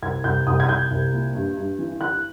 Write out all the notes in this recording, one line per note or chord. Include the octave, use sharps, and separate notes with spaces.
C2 G#6
C2 G6
C2 D#6
G#6
C2 G6
C2
A#2
G2
G2
E3
E3 F#6